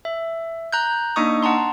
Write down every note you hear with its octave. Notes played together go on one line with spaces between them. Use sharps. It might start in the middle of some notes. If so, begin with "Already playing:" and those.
E5
A#5 F#6 G6
A#3 D4 D#4 D#5 C#6 D#6
F#5 A5 A#5 C6